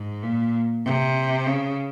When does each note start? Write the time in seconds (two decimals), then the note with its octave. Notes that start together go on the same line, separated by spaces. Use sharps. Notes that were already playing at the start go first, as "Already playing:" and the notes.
Already playing: G#2
0.23 A#2
0.85 C3
1.47 C#3